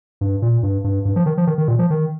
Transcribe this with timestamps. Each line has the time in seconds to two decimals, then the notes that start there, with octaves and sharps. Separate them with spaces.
0.21 G2
0.42 A#2
0.63 G2
0.84 G2
1.05 G2
1.16 F3
1.26 D#3
1.37 F3
1.47 D#3
1.58 D#3
1.68 A#2
1.79 F3
1.90 D#3